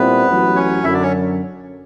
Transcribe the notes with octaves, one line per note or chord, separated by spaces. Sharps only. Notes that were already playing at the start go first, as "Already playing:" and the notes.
Already playing: A#2 G3 B3 C4 E4 B4
A1 A2 F#3
C#4 C#5
F#2 D3 F#3 E4 E5
D4 D5
C#4 C#5